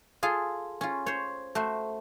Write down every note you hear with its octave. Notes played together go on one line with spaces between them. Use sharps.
F4 G#4 A4 F5
C#4 F4
C5 C#5
A3 F#4 C5